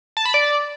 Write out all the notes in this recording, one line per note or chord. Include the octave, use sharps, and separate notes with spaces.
A5
B5
D5